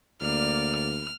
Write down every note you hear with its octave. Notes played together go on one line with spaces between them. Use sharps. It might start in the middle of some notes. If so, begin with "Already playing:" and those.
D2 A#3 D5 F6